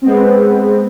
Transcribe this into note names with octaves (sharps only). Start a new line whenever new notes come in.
G#3 B3 C4